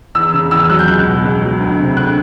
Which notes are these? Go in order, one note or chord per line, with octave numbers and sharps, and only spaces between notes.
E2 E6
C#3
E2 E6
F6
F#3 F#6
G6
C#2 F#6
B2
C#2
F#3
D2
C3
D2 F#6